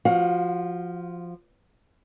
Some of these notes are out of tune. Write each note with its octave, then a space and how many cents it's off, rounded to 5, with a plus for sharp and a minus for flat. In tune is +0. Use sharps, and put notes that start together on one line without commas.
F3 +0 F#4 +0 F5 +30